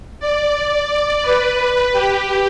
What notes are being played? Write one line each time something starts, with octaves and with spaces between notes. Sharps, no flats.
D5
B4
G4